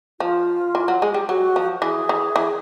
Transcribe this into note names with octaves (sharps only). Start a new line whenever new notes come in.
F3 F4
E3
F#3
G#3
G3
F#3 F#4
F3
E3 G#4
E3
E3